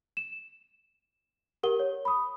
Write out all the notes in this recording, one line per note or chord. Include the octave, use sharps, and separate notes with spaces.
E7
G4 A#4 F#5 G7
C#5
B5 D#6